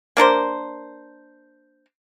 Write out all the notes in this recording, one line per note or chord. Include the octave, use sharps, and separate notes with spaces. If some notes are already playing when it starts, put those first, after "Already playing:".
A#3 D4 A#4 C5